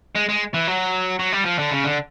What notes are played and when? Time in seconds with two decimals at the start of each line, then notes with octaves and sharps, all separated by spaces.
0.16 G#3
0.29 G#3
0.54 E3
0.68 F#3
1.19 F#3
1.32 G3
1.45 F3
1.58 D3
1.71 C#3
1.84 D3